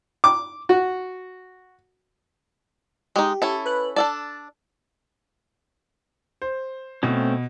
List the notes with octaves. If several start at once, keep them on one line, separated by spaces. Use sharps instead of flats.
D6
F#4
G#3 D#4 G4
C#4 E4 A4
B4 F#6
D4 A4 D5 A5
C5
B2 A3 C4 C#4